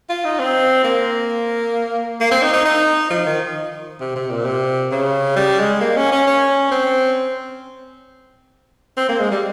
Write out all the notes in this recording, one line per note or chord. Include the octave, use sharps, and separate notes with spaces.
F4
D#4
C4
A#3
A#3
C4
D#4
D#4
D#4
F3
D#3
C3
C3
A#2
C3
C#3
G3
G#3
A#3
C#4
C#4
C#4
C4
C4
A#3
G#3
G3